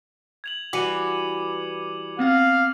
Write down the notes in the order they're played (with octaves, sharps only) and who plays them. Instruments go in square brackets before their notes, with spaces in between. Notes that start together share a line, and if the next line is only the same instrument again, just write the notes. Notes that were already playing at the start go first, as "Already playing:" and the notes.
[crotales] G#6 F7 F#7
[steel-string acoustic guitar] E3 G3 F#4 [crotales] D6 C#7 D#7
[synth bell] B3 C4 F#5 [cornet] F5